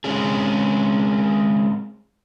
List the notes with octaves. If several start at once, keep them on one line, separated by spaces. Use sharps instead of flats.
G#3 C4 C#4 G#4